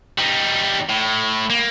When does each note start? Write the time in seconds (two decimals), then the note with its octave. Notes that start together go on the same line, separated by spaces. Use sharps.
0.19 G3 D#4
0.89 A2
1.50 A#3